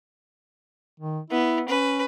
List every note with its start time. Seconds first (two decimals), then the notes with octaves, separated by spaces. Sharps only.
1.00 D#3
1.30 B3 E4
1.68 C#4 B4